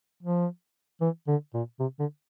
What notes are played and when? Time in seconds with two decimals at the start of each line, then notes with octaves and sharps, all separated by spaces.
0.23 F3
1.01 E3
1.28 D3
1.54 A#2
1.80 C3
1.99 D3